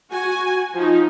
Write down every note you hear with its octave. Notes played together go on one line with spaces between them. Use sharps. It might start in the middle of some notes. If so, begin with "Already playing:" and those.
F#4 G#5
F3 D#4